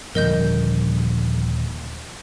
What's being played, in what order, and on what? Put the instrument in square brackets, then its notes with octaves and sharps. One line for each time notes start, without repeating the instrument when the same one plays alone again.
[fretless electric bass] D#1 A#2 D3 [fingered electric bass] F3 G3 [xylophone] A#4 D#5 G6